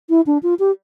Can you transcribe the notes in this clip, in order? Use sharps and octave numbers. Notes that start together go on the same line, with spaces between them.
E4
D4
F4
G4